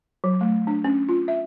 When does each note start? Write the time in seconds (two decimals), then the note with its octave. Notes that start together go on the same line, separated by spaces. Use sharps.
0.24 F#3
0.41 A3
0.67 D4
0.84 C#4
1.09 F4
1.28 E5